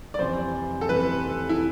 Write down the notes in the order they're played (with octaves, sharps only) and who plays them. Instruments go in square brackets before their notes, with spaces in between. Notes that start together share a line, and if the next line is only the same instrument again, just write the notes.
[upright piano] D5
[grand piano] F2 C3 E3 [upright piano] C5
[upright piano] A4
[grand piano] F2 C3 E3 [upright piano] B4
[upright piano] E4